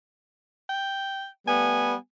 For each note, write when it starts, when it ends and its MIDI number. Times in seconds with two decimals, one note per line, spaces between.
0.69 1.27 79
1.47 1.95 55
1.47 1.95 57
1.47 1.95 59
1.47 1.94 80